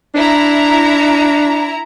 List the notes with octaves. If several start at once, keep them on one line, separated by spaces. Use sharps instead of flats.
D4 E4 A#5